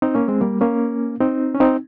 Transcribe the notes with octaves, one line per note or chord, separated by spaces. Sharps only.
C4 D#4
A#3 C#4
G#3 C4
G3 A#3
A#3 C#4
C4 D#4
C#4
C4 D#4